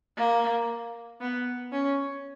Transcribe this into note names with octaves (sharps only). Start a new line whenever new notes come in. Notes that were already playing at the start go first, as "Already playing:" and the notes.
A#3
B3
C#4